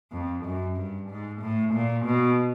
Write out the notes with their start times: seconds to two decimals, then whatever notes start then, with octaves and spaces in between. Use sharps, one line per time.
0.12 F2
0.45 F#2
0.77 G2
1.09 G#2
1.41 A2
1.74 A#2
2.06 B2